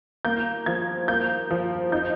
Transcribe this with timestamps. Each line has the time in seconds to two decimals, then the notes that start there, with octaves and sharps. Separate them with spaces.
0.25 A#3 G6
0.66 F3 G#6
1.08 A#3 G6
1.51 F3
1.92 D#4 G6